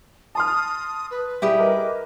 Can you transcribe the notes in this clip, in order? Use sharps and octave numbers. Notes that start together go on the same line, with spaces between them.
A5 C6 D#6 F6
B4
G3 E4 G4 G#4
A#4 B4 D#5 D6